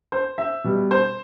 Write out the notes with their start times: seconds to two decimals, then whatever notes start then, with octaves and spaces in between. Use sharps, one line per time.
0.12 C5
0.38 E5
0.64 B2 G3
0.91 C5